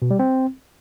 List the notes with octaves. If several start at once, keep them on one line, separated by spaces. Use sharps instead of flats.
B2
G3
C4